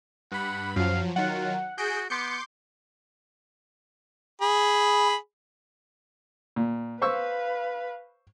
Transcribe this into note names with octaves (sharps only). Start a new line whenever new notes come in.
G2 F#5 B5
F#2 F3 F#3 F5
D#3 F#3 F4 F#5
F#4 G#4 G6 D7
B3 C6 D6 G6 C#7
G#4 B5
A#2
B4 C5 F5 C#6 E6